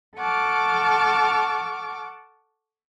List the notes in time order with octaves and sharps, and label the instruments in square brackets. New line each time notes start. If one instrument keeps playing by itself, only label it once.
[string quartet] A4 F#5 A5 C#6 D6 F6